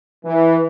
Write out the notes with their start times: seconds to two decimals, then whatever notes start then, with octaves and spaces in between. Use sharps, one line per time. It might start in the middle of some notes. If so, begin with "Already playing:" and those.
0.25 E3